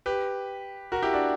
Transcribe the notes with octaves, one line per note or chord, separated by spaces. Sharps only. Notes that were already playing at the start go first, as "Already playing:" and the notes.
G4 B4
F#4 A#4
E4 G4
D4 F#4